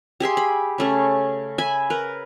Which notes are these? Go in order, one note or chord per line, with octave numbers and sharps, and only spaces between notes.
G4 G#4 E5 C6
B5
C#3 A3 C#4
E5 G#5 B5
A#4 B4